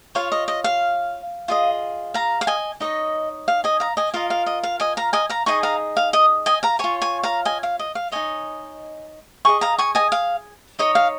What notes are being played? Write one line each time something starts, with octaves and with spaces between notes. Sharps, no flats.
F4 C#5 F5
D#5
D#5
F5
F4 G#4 D#5
F5 A#5
F5
D#5 G#5
D#4 C#5 D#5
F5
D#5 G#5
F5 A#5
D#5 G#5
F4 A#4 D#5 F5
F5
D#5
F5
D#5 G#5
F5 A#5
D#5 G#5
F5 A#5
D#4 G#4 D#5 G#5 C#6
F5 A#5
F5
D#5
D#5 G#5
F5 A#5
F4 C#5 G#5 C#6
G#5 C#6
F5 A#5
D#5 G#5
F5
D#5
F5
D#4 C#5 D#5 G#5
G#4 D#5 G#5 C#6
F5 A#5
G#5 C#6
D#5 G#5
F5
D#4 C#5 D#5
F5